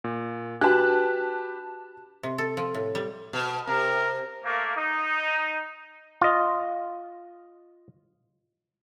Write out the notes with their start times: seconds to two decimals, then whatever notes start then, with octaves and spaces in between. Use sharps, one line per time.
0.04 A#2
0.61 D4 F#4 G4 B4 A5 F#6
2.23 C3
2.38 A4
2.57 F3
2.74 A2
2.95 G3
3.33 B2
3.67 C3 A#4
4.44 A3 A#3
4.77 D#4
6.21 F4 D#5